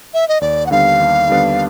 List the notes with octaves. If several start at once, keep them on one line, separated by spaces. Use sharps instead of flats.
E5
D#5
D#2 D5
F#5
D3 G3 B3 D4 F5
D#2
D3 G3 B3 D4